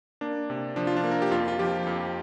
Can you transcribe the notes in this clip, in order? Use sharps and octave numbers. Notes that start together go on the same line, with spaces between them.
A#3 D4
C3
F3 D4
F4
D4
A#3
A#4
G4
F2 F4
F4
F3 G4
F2